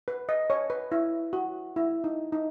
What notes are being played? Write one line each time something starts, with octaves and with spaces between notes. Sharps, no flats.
B4
D#5
C#5
B4
E4
F#4
E4
D#4
D#4